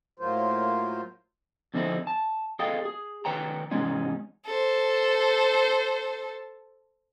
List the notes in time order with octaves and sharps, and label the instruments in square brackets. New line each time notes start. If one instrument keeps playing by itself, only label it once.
[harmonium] A2 F#3 A#3 F4 C5
[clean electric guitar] F2 D3 C4 D#4 E4
A5
G#4 A4 D#5 F5 G5
G#4
D#3 B4 C#5 G5 A#5
G#2 C3 E3 G#3 C#4 D#4
[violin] A4 C5